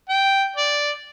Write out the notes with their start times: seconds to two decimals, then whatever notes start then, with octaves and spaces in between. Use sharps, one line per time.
0.09 G5
0.56 D5